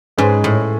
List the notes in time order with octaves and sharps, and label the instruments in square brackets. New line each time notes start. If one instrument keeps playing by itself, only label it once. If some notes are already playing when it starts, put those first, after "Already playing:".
[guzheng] G#2 [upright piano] G#3 C#4 G#4 B4
[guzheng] A2